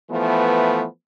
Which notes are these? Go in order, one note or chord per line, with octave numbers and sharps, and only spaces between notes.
E3 F3 A3 B3